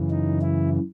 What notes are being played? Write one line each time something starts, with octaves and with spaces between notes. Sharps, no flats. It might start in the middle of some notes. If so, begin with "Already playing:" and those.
Already playing: F#2 C#3 E3
D#4
E4